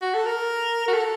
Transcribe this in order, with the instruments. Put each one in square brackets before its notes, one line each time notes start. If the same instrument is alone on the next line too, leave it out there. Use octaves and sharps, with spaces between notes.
[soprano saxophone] F#4
A4
A#4
F#4
A4